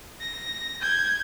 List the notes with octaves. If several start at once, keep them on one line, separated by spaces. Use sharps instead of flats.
A#6
G6 G#6